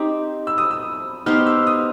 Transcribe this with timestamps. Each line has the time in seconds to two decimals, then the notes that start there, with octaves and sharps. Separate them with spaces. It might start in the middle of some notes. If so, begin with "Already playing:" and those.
Already playing: C4 D#4 G4
0.47 E6
0.58 D#6
0.71 E6
1.26 B3 D#4 G4 C5 F6
1.46 E6
1.67 D#6